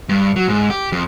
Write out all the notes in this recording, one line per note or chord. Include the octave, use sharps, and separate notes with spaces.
G2
F#3
G#2
G4
F2